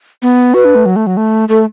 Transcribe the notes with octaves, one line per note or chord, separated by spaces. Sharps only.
B3
F#4 B4
D4
A3
F#3
A3
F#3
A3
A3 A4